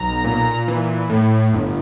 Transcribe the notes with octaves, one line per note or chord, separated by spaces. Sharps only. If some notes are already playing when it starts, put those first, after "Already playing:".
Already playing: B1 A#5
A#2
E3
A2
G1